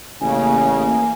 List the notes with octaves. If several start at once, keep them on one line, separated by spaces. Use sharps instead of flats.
A1 C#3 A#3 G#5